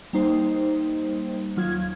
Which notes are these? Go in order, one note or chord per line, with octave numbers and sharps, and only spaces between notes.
G3 A#3 D#4 C5
D#2 F#3 F4 G#6